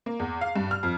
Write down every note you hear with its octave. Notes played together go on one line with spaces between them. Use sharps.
A#3
E2
F5
G2
F6
F2